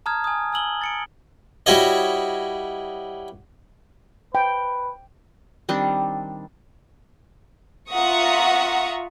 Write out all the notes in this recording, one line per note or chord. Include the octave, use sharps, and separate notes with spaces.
A5 A#5 D#6 F6 G#6
G#5 D#6
G#5 E6 F#7 G7
A6 C#7 D7
G3 E4 F#4 C#5 D#5
B4 G5
D#3 G3 C4 D4
F4 E5 F#5 A#5 C#6 D#6